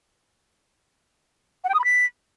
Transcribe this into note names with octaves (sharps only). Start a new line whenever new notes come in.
F#5
G5
D#6
B5
B6